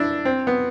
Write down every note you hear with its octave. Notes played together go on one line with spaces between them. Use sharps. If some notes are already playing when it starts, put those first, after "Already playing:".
Already playing: D4 E4
C4
B3